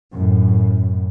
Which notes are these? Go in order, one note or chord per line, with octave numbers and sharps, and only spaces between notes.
F#2 A2